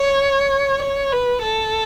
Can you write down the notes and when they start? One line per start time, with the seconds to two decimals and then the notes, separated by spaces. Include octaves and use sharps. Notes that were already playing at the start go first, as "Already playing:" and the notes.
Already playing: C#5
0.82 C#5
1.12 B4
1.42 A4